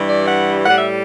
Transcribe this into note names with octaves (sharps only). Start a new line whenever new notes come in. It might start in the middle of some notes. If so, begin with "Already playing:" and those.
Already playing: G2 E3 G3
D5
F#5
A2 G3 F#5
E5